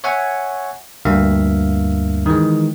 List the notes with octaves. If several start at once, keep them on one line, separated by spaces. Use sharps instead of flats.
C#5 E5 F#5 G#5 C#6
D2 G2 A#3 E5 F5
D#3 E3 G#3